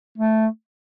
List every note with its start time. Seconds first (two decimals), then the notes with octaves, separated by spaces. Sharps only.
0.18 A3